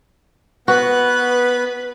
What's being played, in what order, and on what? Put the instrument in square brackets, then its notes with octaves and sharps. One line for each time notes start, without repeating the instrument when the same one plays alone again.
[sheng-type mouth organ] B3 F#6 [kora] F#4 [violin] B4